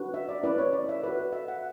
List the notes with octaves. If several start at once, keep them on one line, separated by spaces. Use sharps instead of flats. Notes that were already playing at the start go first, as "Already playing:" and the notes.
Already playing: D4 F#4 B4
E5
D5
C#4 E4 B4 D5
C#5
D5
E5
F#4 B4
E5
F#5